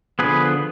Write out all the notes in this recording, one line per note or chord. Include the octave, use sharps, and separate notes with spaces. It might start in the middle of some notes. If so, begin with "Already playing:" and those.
D3 F3 B3 G#4 B4